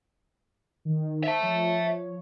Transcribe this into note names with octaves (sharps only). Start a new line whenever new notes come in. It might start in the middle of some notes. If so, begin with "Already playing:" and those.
D#3
C5 E5 A5
F3 C#5